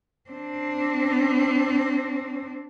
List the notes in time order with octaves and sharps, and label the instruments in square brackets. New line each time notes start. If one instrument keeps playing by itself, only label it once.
[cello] C4 D4